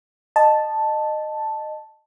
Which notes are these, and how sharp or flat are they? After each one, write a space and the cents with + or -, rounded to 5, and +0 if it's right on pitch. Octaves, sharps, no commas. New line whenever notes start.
D#5 -20 A5 +0